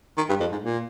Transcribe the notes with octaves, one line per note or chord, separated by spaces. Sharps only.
D#3
G2
F2
G#2
A#2